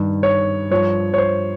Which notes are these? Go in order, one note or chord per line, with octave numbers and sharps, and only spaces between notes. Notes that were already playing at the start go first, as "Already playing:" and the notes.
Already playing: G2 D#3
C#5
G2 F3 C#5
C#5
C5